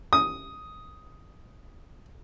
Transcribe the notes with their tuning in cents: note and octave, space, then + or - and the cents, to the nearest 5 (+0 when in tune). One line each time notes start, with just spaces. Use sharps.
D#6 +5